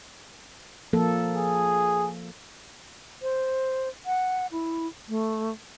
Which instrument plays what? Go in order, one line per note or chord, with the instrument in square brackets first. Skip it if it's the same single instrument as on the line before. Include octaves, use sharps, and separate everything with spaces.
[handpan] F3 A#3 A4
[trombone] G#4
[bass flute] C5
F#5
E4
A3